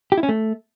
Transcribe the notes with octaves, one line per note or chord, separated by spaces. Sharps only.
G4
E4
C#4
A3